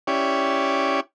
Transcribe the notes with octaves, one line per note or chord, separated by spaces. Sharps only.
C#4 E4 G4 C#5 D5